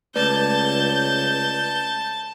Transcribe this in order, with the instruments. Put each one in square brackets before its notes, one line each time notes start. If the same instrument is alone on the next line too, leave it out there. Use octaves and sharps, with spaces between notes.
[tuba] C#2 [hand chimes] A3 B4 D5 [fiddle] A5 [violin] G6